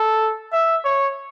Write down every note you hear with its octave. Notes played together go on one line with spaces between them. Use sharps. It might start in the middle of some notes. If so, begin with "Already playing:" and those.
Already playing: A4
E5
C#5